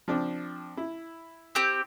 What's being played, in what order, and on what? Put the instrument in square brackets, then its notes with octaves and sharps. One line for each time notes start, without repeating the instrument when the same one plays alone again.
[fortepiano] F3 C4 D4
E4
[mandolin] C4 G4